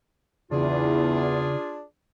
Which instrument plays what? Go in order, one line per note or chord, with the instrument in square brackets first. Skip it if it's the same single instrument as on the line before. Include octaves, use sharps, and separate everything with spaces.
[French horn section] E2 [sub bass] C#3 [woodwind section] D4 F4 G#4